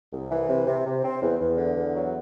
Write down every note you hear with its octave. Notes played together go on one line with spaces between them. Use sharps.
C2
E3
C3
C3
C3
C4
E2
E2
D3
E2
F#3